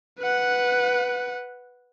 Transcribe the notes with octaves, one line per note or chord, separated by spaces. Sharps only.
B4 F#5